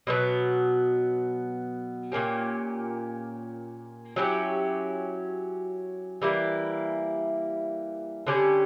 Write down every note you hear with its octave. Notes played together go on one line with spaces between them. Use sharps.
B2 F#3 B3
A#2 A#3 C#4 G4
F#3 C#4 E4 G4
E3 G3 A#3 E4
D3 G3 C#4 G4